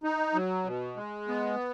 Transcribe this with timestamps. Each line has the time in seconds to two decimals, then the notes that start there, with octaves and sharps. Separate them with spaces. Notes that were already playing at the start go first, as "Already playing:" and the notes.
0.03 D#4
0.34 F#3
0.65 B2
0.96 G#3
1.28 B3